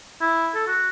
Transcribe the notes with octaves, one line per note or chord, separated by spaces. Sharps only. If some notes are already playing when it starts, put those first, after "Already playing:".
E4
A4
F#4